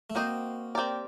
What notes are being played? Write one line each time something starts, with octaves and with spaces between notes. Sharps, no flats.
A3
A#3 C4 F#4 C5 D#5
C4 G4 A#4 D5